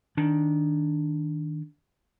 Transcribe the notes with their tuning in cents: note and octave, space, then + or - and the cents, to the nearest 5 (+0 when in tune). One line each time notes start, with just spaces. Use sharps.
D#3 +5 D4 +0